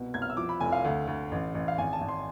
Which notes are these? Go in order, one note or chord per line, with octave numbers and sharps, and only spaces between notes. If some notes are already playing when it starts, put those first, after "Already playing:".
Already playing: C2 B2
C2 G#6
F6
E6
F3 D6
B5
F1 G#5
F5
D2
D2
A1
A1
F5
G#1 G#5
A5
G#1
C6